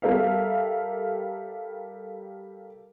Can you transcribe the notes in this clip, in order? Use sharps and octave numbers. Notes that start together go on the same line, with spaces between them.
G3 A4 A#4 E5 F5